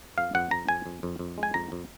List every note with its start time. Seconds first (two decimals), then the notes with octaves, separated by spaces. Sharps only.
0.18 F2 F5
0.35 F2 F#5
0.51 F2 A#5
0.69 F2 G#5
0.86 F2
1.03 F2
1.19 F2
1.38 G#3
1.43 G#5
1.54 F2 A#5
1.72 F2